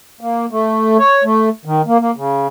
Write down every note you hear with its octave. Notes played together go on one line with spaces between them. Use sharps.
A#3
A3
C#5
A3
D#3
A#3
A#3
C#3